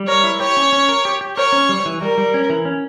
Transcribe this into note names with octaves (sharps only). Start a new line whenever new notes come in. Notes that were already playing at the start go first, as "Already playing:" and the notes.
Already playing: G3
A#4 C#5
E4
G4 C#5
C#4
C#4
A#4
G4
G4
A#4 C#5
C#4
G3
E3
G3 A#4
G3
C#4
E3
C#4